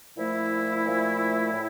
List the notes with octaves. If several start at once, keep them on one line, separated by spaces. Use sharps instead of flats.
A#2 F3 A3 E4
A#2 F3 A3
A2